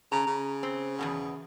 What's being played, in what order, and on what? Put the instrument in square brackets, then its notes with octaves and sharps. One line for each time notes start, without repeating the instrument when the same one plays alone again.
[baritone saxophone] C#3 [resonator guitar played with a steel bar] A#5
[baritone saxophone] C#3
[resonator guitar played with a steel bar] C4
E2 G#2 B2